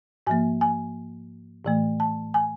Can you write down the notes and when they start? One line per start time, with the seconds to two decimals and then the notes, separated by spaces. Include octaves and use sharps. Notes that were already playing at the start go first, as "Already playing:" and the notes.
0.27 G#2 F3 A#3 G#5
0.61 G#5
1.65 A2 E3 A3
2.00 A5
2.34 G#5